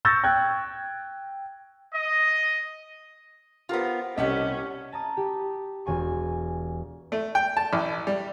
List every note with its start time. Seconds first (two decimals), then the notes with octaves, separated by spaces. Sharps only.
0.05 C#6 E6 G6 A6 A#6
0.23 G5 F#6 G#6
1.94 D#5
3.69 B3 F4 G4 A#4 C5
4.18 C2 G3 A3 C#4 G4 D#5 F#5
4.92 A5 A#5 D#6
5.17 G4
5.86 E1 G#5 C#6
7.12 A3
7.35 G5
7.57 A5
7.73 A1
8.07 G3